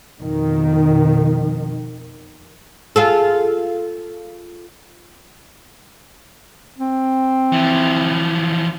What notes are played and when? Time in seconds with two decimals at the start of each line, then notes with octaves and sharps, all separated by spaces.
0.22 F2 B2 D#3
2.96 F4 G#4 A4
6.79 C4
7.52 E3 F3